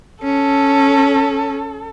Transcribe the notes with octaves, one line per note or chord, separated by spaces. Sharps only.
C#4 A4